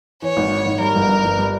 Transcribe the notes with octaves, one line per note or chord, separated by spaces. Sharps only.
E3 C#5
G#1
G#2
G#1
G3 A#4
G1
G2
G1
G3